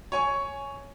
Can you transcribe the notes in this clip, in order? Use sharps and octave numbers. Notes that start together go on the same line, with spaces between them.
C#5 G#5 C#6